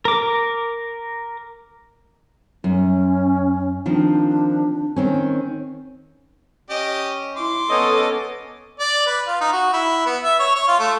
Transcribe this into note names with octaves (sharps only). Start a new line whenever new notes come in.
A#4 D6
F#2 C#4
D#3 F3 C4 D4
D#3 C4 C#4
C#4 G4 D#5
E4 C6 D6
B3 C#4 A4 C#5 D#5
D5
B4
F4
D#4
F#4
E4
B3
E5
C#5
C#5
F4
A3